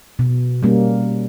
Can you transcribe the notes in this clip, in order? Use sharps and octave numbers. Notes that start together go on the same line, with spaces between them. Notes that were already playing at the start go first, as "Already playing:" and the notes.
B2
G3 A#3 C#4